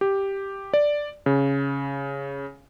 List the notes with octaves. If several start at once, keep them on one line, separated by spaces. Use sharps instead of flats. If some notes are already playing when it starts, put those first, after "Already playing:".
G4
D5
C#3